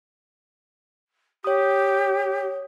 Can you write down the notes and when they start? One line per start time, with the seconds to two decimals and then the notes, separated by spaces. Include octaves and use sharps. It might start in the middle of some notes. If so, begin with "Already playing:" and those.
1.44 G4 C#5 D#6